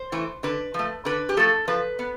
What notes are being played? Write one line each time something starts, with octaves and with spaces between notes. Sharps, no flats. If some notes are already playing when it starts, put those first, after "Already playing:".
Already playing: C5
E3 A3
D3 B4
F3 A3
D3 B4
G4
F3 A3 A4
F3 B4
B3